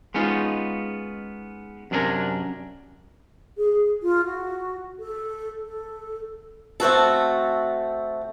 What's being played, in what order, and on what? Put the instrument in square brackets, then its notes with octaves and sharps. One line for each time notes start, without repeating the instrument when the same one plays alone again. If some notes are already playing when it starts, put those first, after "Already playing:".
[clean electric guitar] G#3 B3 C#4 D#4 F4
F#2 C3 D4 G#4 A#4 G#5
[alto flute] G#4
F4
F#4
A4
A4
[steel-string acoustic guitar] A3 C4 F#4 A4